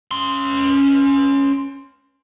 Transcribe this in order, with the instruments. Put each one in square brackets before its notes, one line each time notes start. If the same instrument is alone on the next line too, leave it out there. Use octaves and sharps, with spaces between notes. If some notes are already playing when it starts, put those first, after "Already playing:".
[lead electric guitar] C#4 C6